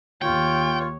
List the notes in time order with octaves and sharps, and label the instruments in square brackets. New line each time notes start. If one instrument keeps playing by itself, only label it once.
[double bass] D#2 [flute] F4 [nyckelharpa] C#5 [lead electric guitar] G5